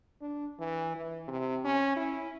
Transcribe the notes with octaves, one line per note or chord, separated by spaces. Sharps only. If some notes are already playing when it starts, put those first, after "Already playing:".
D4
E3
E3
C3
C#4
E4